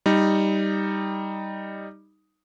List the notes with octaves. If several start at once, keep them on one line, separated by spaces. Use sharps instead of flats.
G3 D#4